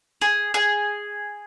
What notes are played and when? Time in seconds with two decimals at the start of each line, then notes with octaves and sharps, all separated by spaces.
0.21 G#4
0.54 G#4